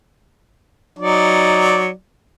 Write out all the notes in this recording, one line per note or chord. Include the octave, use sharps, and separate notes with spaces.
F#3 D#4 D5